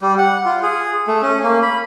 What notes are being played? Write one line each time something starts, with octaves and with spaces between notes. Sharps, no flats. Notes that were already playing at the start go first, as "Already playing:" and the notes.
G3
F#5
F4
G#4
A3
C#4
A#3
B5